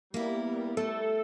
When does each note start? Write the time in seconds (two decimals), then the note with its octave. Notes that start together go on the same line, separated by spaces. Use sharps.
0.14 G3 A#3 B3 E4 A#4
0.77 A3 A4